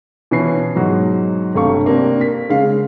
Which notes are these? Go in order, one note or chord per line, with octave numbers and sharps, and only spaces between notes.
B2 E3 C#4 B4 C#5 C7
G#2 B2 F#3 D#4 F#4
G1 C3 A3 F5 C#6
C3 A#3 C4 D4
B6
C#3 G#3 F5